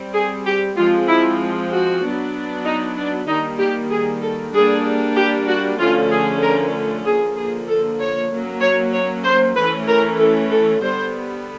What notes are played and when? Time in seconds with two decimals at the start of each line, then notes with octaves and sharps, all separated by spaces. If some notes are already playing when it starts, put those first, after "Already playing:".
Already playing: G3 C4
0.14 G#4
0.45 G4
0.77 F3 G#3 C4 F4
1.08 E4
1.71 F#4
2.02 F#3 B3 D4
2.65 D#4
2.97 D4
3.27 D#3 G3 A#3 D#4
3.59 G4
3.91 G#4
4.22 A4
4.53 G3 A#3 D4 G#4
5.16 G4
5.48 F#4
5.79 D3 F3 A3 C#4 F4
6.11 G#4
6.42 A#4
7.05 D3 F3 A#3 G#4
7.36 G#4
7.68 A4
8.00 C#5
8.31 F#3 A#3 C#4
8.62 C#5
8.93 C#5
9.24 C5
9.56 E3 A3 C#4 B4
9.88 A#4
10.19 A4
10.51 A4
10.81 D3 G3 B3 C5